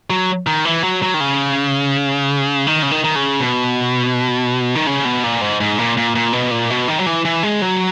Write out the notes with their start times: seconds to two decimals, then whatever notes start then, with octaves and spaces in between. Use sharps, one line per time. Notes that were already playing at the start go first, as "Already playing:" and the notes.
0.10 F#3
0.47 D#3
0.65 E3
0.84 F#3
1.02 F#3
1.14 D#3
1.20 C#3
2.67 D#3
2.82 C#3
2.91 D#3
3.04 D#3
3.16 C#3
3.40 B2
4.75 D#3
4.87 C#3
5.05 B2
5.24 A#2
5.41 G#2
5.60 G#2
5.78 A#2
5.97 A#2
6.15 A#2
6.33 B2
6.51 A#2
6.70 B2
6.88 D#3
6.99 F#3
7.06 E3
7.25 E3
7.43 G#3
7.62 F#3